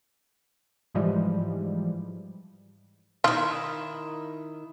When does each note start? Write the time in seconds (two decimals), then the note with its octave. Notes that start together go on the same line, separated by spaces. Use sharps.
0.95 G#2 E3 F3 G3 G#3
3.24 D#3 E4 F4